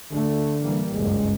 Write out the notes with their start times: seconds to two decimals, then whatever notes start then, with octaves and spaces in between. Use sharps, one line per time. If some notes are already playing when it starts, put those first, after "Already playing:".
0.12 D3 A3
0.62 E3 G3 A#3
0.94 F#1 C#2 G2 G#3